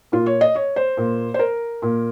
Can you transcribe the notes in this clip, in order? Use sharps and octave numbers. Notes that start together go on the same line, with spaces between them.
A#2 F4
C#5
D#5
C#5
C5
A#2
C5
A#4
A#2